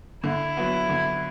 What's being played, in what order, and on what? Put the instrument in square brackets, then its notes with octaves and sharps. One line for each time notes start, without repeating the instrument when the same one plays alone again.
[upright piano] D3 [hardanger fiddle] E4
[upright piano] F#3 B3
D3